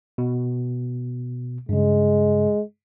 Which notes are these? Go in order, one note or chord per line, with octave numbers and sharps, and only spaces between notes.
B2
G2 C#3 G#3